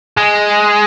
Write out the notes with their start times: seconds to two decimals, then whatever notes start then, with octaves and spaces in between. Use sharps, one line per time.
0.17 G#3